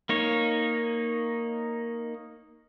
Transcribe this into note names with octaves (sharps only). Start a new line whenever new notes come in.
A#3 D#4 C#5